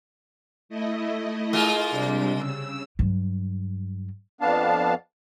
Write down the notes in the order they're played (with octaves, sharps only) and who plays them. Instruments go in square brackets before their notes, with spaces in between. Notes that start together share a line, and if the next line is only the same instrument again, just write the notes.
[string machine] A3 E4 D#5
[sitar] G#3 A#3 F4
[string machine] C3 G3 D4
C#3 E6
[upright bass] G2 F#3
[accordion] F2 B3 D4 F5 A5